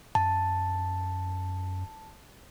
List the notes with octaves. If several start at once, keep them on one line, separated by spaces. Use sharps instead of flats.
F#2 A5